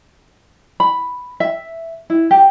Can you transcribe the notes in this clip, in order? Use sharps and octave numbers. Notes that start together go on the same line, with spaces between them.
B5
E5
E4
G4